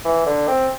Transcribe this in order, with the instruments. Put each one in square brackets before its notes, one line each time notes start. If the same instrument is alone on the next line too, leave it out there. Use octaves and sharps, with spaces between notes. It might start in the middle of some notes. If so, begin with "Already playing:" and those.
[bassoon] E3
D3
C4